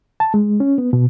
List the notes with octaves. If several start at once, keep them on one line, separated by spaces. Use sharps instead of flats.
A5
G#3
C#4
B3
B2